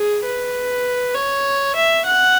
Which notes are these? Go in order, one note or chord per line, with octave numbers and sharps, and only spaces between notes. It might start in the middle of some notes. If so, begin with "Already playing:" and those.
Already playing: G#4
B4
C#5
E5
F#5